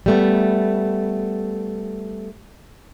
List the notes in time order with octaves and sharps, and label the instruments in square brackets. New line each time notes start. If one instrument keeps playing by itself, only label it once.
[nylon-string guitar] G3 A3 B3